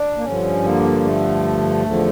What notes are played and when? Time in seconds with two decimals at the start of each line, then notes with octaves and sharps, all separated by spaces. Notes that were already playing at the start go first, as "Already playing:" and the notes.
Already playing: D4
0.17 A#3
0.24 G2 D3 F3 C#4
0.64 A#3
1.04 A3
1.85 E2 D3 F3